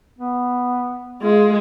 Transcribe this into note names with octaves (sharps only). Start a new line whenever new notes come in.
B3
G#3 F4